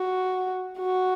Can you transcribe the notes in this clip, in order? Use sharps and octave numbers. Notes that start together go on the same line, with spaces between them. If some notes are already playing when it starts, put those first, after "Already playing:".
Already playing: F#4
F#4